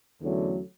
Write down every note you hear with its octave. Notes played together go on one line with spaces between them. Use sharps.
E2 D3 F#3 A3 C#4